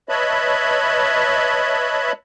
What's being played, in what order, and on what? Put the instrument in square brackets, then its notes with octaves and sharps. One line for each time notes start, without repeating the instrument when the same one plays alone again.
[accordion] B4 C#5 D#5 E5 A5 B5